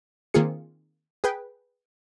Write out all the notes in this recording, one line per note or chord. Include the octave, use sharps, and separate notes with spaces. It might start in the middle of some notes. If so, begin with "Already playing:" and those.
D#3 A#3 C4 F4 G#4 C#7
G#4 B4 G5